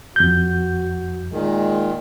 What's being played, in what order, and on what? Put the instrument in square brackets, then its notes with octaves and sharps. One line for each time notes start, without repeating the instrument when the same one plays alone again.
[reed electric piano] F2 G6 [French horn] F#4
[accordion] A#2 D#3 [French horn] G#3